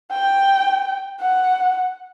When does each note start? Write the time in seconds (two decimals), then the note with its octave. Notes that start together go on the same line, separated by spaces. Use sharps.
0.12 G5
1.21 F#5